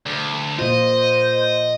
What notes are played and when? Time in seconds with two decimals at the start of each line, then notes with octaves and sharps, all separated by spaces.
0.06 D2
0.59 A#2 F4 C5 D#5